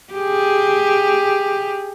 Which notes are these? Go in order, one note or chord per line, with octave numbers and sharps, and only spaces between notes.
G4 G#4